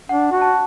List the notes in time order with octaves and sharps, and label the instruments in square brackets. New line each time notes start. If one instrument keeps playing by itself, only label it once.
[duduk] D4 [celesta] F#5
[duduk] F#4
[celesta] A5